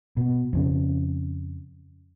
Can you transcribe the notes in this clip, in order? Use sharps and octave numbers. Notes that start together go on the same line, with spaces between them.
B2
F2 C#3